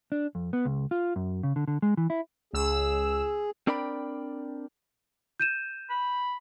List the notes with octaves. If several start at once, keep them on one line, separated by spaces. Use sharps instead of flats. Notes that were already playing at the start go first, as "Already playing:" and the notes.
D4
F2
B3
C#2
F4
F#2
C#3
D3
D3
G#3
E3
E4
C#2 G#4 E6
C4 D4 A#4 D5 G5 B5
G6 D#7 E7
B5